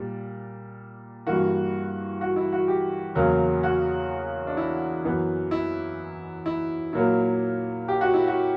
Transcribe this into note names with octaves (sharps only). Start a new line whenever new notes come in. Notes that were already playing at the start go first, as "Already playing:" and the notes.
Already playing: A#2 G3
G2 E3 A#3 F#4
F#4
E4
F#4
G4
E2 C#3 F#3 A#3
F#4
D4
E4
F#2 E3 B3
E4
E4
A#2 F#3 A#3 E4
G4
F#4
E4
F#4